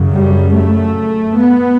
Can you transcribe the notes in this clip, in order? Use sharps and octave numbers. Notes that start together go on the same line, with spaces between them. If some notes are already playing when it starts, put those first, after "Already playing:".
Already playing: F#2 C#3
G3
A3
B3